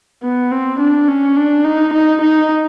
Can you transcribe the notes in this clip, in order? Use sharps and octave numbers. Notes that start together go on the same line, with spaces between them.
B3
C4
D4
C#4
D4
D#4
D#4
D#4